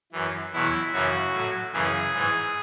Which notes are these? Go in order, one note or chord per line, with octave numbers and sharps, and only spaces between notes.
F#2 E3
E2 B2 F#3 E4
F#2 C#3 E3 F#4
A2
F#3
F#2 C#3 E3 G#4
G#2 E3